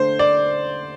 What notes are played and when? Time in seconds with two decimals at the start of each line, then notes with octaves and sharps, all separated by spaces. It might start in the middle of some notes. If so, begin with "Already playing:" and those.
Already playing: D3 A3 D4 C5
0.19 D5